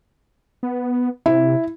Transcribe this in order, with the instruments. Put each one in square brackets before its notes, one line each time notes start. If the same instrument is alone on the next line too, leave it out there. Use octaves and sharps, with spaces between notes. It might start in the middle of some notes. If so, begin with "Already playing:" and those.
[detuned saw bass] B3
[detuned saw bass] C3 [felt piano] E4